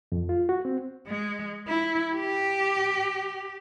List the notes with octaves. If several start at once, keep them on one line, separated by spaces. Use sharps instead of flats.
F2
F4
F#4
C4
G#3
E4
G4